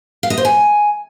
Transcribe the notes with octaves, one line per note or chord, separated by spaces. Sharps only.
F5
D#5
C5
G#5